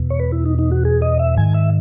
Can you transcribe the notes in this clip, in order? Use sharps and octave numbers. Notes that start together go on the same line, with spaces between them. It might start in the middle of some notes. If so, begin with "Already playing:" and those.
Already playing: E2 B2
C#5
B4
E4
D#4
D#4
F#4
G#4
D#5
E5
G#2 D#3 G#5
E5